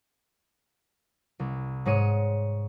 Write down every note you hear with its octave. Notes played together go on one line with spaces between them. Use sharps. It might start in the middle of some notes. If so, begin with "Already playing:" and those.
C2
G#2 G#3 C#5 C#7 D#7